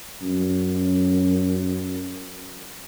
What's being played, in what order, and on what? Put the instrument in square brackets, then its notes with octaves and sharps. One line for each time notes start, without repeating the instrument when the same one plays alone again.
[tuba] F#2